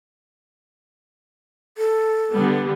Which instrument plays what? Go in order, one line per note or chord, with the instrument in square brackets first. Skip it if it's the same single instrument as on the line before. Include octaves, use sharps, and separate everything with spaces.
[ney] A4
[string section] D3 G3 B3